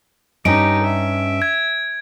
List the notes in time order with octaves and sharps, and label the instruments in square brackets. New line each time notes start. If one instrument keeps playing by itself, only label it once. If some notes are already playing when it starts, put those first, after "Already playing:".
[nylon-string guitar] G2 C#4 D#5 [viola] D#4 G4 [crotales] D7
[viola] E5
[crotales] G#6